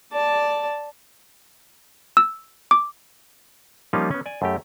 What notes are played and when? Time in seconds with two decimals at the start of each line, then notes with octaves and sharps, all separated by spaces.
0.13 D5 A5
2.17 E6
2.71 D6
3.93 F3 G3 A#3 C#4 D#4 F4
4.11 B3 C#4
4.26 D5 G#5
4.42 F#2 A3 G4